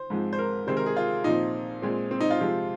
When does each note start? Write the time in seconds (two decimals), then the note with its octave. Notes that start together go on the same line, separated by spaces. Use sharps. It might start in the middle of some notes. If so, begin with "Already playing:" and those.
Already playing: C5
0.10 G#2 F3 G#3 C4
0.33 C5
0.39 A#4
0.67 C3 D#3 G#3 C4 C5
0.77 A#4
0.86 G#4
0.97 F4
1.24 A#2 F3 C4 D#4
1.82 A#2 G#3 C4
2.11 C4
2.20 D#4
2.30 F4
2.40 C3 F3 G#3 C4